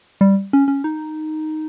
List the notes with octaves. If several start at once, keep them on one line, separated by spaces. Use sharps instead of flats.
G3
C#4
C#4
D#4